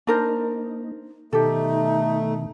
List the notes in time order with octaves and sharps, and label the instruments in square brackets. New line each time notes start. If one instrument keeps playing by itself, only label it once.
[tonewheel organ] A#3 D#4 [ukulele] D4 A#4 C5
[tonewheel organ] B2 D#3 [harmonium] A3 [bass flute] D#4 [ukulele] G4 A4